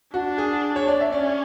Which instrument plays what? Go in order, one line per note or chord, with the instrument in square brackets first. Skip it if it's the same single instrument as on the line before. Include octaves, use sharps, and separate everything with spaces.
[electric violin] D4 [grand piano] F#4
[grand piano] G#4
C#5
D5
E5
[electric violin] C#4 [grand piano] D5